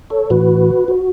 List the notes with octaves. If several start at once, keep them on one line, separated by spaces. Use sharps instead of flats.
A4 C#5
A2 E3 F#4 B4
F#4